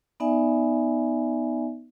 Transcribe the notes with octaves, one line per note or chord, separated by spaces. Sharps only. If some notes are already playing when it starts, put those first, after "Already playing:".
B3 D#4 D5 E5 G#5